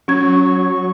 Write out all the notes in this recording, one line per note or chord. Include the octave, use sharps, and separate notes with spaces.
F#3 C#4 C#6 G#6